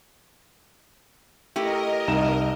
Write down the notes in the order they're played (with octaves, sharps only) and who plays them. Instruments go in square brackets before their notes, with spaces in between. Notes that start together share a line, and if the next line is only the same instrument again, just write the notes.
[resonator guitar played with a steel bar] A3 E4 G4 [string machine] A#4 D#5
[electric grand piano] C2 D#4 E7